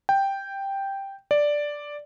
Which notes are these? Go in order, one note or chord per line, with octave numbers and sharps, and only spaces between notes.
G5
D5